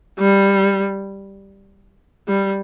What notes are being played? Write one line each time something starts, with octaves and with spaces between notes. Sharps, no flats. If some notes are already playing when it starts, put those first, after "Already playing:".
G3
G3